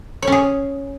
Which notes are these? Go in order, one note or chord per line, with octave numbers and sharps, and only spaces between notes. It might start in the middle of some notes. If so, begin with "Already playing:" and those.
C#4 G#4 C#5